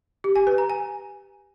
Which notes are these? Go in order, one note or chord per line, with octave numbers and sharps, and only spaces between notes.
G4
G#5
B4
A#5
G#5